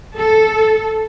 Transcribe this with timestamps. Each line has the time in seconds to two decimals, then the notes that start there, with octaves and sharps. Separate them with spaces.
0.17 A4